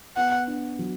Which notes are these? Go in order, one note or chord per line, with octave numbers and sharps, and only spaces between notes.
B3 F#5
D4
F#3